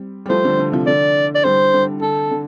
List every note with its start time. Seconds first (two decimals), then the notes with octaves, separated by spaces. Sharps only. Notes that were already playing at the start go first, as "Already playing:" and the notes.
Already playing: G3 C4
0.26 G3
0.29 F3 A3 C5
0.45 D3 G3
0.59 D3
0.72 C3 F3
0.87 D3 D5
1.35 D5
1.44 D3 G3 C5
1.73 D3 G3
2.02 D3 A4
2.31 D3